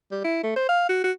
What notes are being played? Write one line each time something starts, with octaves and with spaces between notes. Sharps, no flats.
G3
E4
A3
C5
F5
F#4
F#4